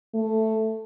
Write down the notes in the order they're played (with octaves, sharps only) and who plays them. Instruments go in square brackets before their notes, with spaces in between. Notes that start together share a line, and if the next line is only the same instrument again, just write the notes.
[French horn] A3